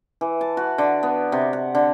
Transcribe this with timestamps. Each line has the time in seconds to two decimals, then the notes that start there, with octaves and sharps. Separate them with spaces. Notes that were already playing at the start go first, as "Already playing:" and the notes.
0.21 E3
0.41 A5
0.57 F#4
0.78 D3
1.03 B3
1.32 C3
1.53 F#5
1.75 D3